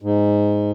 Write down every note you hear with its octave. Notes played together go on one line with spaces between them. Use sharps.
G#2